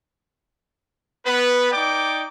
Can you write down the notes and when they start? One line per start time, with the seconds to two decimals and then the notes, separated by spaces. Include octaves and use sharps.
1.26 B3 B4
1.72 D#4 D5 G5 D6